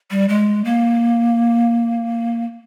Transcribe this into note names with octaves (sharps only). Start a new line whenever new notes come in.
G3
G#3
A#3